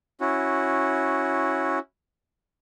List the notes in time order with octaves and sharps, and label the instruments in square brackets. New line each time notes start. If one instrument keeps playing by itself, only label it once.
[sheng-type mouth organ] C#4 E4 F#4